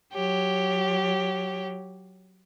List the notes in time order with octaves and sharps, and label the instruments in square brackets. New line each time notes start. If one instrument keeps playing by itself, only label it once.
[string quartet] F#3 G4 C#5